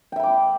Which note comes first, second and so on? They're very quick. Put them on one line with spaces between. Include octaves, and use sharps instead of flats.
G5 E5 B5 D6